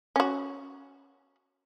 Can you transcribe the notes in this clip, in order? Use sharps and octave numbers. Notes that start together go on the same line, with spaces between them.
C#4 F#4